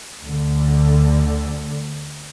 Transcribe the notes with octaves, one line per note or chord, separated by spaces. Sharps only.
D2 D3